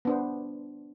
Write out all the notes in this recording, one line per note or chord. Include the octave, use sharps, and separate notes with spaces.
B3 D4 C5